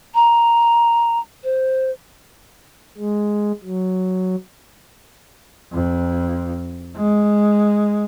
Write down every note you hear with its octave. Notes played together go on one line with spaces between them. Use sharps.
A#5
C5
G#3
F#3
F2
G#3